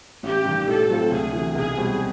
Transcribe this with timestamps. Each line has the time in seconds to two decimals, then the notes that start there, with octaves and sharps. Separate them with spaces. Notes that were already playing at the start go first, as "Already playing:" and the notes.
0.23 A1 G4
0.44 G2 D#3
0.67 A2 A4
0.89 F#3 A3 C4 F4
1.12 D2 G#4
1.33 E3
1.38 C3
1.55 B1 G#4
1.77 B2 G3 C4